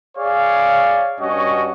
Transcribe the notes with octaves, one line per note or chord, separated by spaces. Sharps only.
G#4 C#5 D5 F5
G2 C#4 F#4 D#5